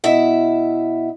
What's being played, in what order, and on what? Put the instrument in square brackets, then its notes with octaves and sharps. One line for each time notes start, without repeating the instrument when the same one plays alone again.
[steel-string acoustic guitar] B2 E4 E5